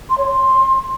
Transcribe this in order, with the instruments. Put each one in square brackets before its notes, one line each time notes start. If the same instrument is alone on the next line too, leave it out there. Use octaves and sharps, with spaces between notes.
[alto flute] C6
C#5
C6